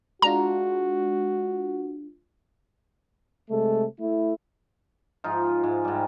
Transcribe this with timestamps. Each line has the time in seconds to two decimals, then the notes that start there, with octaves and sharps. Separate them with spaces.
0.22 G#3 D4 F4 F#4 A#5
3.49 C3 G#3 A3 A4
3.99 A3 E4
5.24 G#2 F3 D#4 F4
5.64 G#2
5.85 G#2 G3